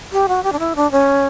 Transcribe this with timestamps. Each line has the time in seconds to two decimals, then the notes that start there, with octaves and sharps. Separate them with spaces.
0.12 G4
0.28 F#4
0.44 G4
0.52 D4
0.59 E4
0.76 D4
0.92 C#4